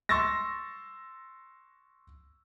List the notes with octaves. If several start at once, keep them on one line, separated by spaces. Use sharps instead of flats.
C6 C#6 E6 A6 A#6